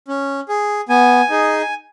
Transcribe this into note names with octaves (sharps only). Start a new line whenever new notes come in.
C#4
G#4
B3 G#5
D#4 G#4